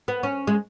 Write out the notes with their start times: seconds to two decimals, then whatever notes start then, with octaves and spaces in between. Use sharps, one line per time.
0.08 B3
0.23 C#4
0.47 G#3